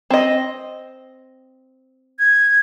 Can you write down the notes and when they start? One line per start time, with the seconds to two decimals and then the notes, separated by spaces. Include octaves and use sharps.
0.10 C4 D#5
2.19 G#6